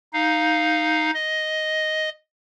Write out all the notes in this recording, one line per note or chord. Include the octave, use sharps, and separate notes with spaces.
D#4 F5
D#5